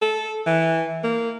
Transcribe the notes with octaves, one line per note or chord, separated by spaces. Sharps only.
A4
E3
A#3